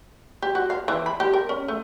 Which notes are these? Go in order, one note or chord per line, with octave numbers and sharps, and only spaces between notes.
G4
F#4
F5
E3
B5
G4
A#4
C#4
A3